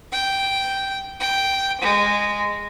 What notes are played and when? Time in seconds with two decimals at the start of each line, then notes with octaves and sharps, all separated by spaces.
0.12 G5
1.20 G5
1.81 G#3